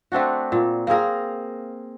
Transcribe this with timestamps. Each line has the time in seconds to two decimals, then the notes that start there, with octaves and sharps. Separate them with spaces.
0.12 A3 C4 D4 F#4
0.52 A#2
0.87 A#3 C4 G#4 A#4